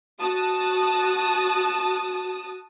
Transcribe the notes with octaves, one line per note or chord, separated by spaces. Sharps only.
F#4 A5 D#6